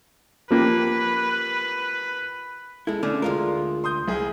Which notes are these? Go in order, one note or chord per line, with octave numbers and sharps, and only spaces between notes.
F3 A#3 G4 B4
G#3 E4 A4
D3 A3 C#4 F6
D2 G#3 F4 A#4
C6 D#6 G6
C2 E4 G#4